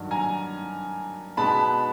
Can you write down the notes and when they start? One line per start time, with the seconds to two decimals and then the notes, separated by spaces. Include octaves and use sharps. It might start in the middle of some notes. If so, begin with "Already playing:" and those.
Already playing: G2 D#3 F#3
0.11 G#5 A#5
1.37 B2 G#3 B3 A5 B5